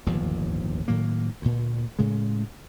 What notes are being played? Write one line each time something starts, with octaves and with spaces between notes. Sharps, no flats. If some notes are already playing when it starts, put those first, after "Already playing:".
D1 G1 D#2 F3
A2 D#3 F#3 A#3
D2 A#2
A2 C#3 G#3